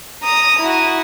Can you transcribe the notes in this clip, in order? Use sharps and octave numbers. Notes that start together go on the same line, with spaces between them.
A#5 D#6
E4 F#4